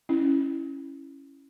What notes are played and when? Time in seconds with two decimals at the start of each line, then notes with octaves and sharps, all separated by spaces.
0.09 C#4 E4